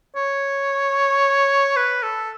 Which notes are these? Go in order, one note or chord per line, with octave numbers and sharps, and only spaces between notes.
C#5
B4
A4